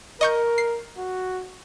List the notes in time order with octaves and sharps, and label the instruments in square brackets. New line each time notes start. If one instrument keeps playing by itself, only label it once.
[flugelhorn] A#4 [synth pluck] D#5 C#6 G6
[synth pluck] C7
[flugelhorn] F#4